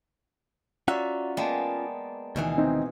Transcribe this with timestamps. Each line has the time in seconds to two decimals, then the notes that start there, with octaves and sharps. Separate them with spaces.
0.88 C#4 F4 F#4 D5 E5 F#5 A#5
1.37 G#3 A#3 B3 D5 G5 A5
2.36 D2 B2 D#3 E3 G#4
2.57 C4 D#4